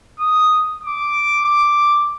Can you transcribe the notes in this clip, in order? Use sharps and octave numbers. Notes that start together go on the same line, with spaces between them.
D#6
D6
D6